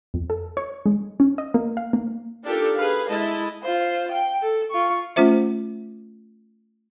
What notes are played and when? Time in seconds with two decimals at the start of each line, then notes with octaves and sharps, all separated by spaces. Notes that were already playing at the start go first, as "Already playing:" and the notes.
0.14 F2
0.30 A4
0.57 C#5
0.86 G#3
1.20 C#4
1.38 D#5
1.54 A#3
1.77 F5
1.93 A#3
2.43 D4 D#4 F4 G4 A4 A#4
2.76 G#4 B4 F5
3.07 G#3 E4 D#5 A5
3.63 F4 C5
4.11 G5
4.42 A4
4.71 F4 C#6
5.16 A3 C#4 F4 C5 E5